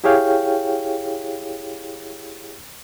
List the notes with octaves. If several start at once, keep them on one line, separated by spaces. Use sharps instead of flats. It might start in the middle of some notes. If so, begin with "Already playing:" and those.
E4 G4 G#4 C#5 F5 G5